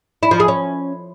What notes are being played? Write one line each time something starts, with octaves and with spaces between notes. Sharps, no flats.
E4
F3
G#4
C#4